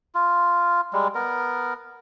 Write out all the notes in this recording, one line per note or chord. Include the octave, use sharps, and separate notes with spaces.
F4
G3 G#3
B3 A#4